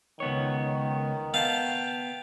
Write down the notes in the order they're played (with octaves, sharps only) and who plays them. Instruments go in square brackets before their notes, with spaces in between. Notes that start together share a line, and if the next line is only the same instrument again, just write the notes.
[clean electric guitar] C#2 B3 C#5 [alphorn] D#3
[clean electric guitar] B3 [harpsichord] F5 A5 [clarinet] G5